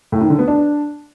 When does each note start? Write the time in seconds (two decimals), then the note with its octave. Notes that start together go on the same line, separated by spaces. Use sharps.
0.12 A2
0.21 D#3
0.30 D3
0.39 B3
0.48 D4